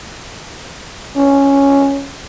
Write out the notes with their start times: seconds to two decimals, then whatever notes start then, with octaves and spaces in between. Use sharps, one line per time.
1.16 C#4